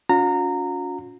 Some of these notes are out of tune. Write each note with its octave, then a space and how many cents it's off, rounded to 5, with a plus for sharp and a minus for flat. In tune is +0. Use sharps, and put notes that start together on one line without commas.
C#4 +30 F4 +45 A#5 -20